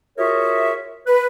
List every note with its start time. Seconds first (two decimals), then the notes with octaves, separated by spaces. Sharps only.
0.18 F4 F#4 G#4 A#4 C#5 E5
1.07 B4